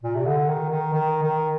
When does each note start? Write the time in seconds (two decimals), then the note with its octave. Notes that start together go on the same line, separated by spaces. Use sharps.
0.03 A#2
0.15 C3
0.26 D3
0.48 D#3
0.69 D#3
0.93 D#3
1.23 D#3